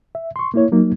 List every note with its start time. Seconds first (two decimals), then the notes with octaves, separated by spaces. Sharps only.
0.15 E5
0.36 C6 C#6
0.54 A#3 E4 C#5
0.72 F#3 A#3 D#4